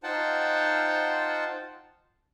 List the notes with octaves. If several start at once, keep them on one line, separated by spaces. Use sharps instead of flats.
D#4 F4 C5 F#5 G5 A5